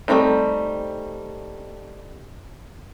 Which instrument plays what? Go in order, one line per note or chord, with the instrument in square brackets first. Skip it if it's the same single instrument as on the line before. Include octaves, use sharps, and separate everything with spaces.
[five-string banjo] G3 A3 A#3 C4 D#4